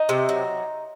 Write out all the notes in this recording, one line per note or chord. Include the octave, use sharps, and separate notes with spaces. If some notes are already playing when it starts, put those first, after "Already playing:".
Already playing: D#4
C3
F#3